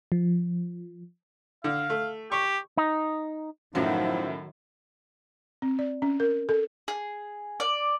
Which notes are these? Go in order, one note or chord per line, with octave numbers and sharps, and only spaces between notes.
F3
D3 F5
A3
G4 C#6
D#4
F#2 A2 D#3 F3 F#3 E4
C4
D5
C#4
A#4
A4
G#4
D5